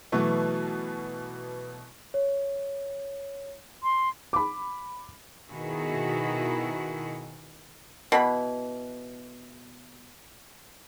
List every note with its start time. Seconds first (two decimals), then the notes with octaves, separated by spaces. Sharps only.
0.12 B2 E3 F#3 A3 B3
2.14 C#5
3.83 C6
4.33 B5 D6
5.50 B2 D#3 E4 F#4 G#4
8.12 B2 E3 B5